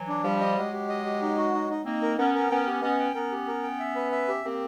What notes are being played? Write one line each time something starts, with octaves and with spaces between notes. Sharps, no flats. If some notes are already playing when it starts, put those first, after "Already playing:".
Already playing: E3 F#3
D4
F3 G3 G4
D#5
F#3 G#3 G4
G4
D#5
G4
D#4
F#4
D#4
D#4
A#3 C4 D#4
A#4
B3 C#4 A#4
A#4
B3 C#4 G5
G4
B3 C#4 D#5
G5
B3 C#4 A#4
G4
A#4
G5
E5
B4
E5
G4
A#3 C4 G4